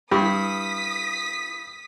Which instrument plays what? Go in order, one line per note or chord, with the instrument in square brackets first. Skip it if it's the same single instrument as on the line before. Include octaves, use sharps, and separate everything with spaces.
[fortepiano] G2 [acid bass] E4 [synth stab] G4 [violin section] D#6 B6